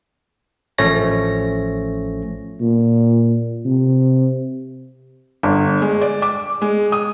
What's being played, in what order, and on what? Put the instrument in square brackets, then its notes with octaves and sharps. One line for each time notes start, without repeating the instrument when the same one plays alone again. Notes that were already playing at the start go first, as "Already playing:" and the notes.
[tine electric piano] A1 F3 A3 C#4 C#5 A#6
[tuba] A#2
C3
[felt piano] G1
G#3
D5
D6
G#3
D#6